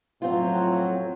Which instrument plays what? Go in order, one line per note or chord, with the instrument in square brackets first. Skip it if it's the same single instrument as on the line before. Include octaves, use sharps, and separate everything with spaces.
[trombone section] F2 A2 F#3 [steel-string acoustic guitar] C4 F4